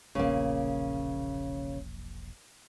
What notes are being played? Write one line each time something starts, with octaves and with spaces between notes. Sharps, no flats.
E1 A#1 A#2 C#3 A#3